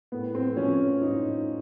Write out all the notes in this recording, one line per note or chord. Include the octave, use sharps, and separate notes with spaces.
A2 B3
C4
F3 C#4
A2 D#4